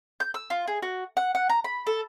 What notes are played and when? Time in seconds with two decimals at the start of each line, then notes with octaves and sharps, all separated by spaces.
0.20 G6
0.34 E6
0.50 F4
0.67 G#4
0.82 F#4
1.17 F#5
1.35 F#5
1.49 A#5
1.64 B5
1.87 A4